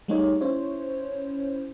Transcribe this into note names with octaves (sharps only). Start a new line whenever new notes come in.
G3 A3 A#3 D#4 G#4 C#5
C#4 E4 C5 C#5